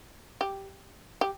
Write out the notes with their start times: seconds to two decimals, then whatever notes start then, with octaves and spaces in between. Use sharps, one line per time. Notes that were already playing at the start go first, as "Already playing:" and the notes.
0.41 G4
1.21 G4